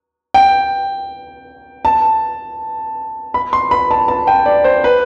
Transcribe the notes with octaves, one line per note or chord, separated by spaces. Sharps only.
G5
A5
B5
C6
B5
A5
A5
G5
D5
C5
B4